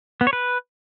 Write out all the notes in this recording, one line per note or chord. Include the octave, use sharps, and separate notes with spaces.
B3
C#5
B4